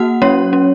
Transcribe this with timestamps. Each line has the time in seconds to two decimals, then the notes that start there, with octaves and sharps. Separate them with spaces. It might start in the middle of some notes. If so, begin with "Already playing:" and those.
Already playing: A#3 F#4 F#5
0.22 F#3 C#4 C#5
0.53 C#4